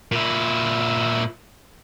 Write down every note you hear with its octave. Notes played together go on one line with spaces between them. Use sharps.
A#2 E4